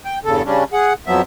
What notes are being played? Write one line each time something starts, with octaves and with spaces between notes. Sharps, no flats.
G5
E2 G2 C#3 A4
C#3 G3 C#4 D4
G#4 F#5
F2 F3 F#3 B3 E5